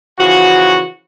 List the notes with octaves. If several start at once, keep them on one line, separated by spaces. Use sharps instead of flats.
C#3 E3 F3 F#4